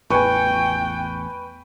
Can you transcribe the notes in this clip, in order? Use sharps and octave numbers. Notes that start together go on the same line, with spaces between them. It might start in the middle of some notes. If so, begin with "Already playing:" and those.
A1 E2 B4 G5 G#5 C#6